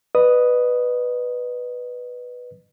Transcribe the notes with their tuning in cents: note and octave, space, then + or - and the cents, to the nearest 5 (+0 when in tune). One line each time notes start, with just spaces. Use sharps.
B4 +0 D#5 -40 D#6 +0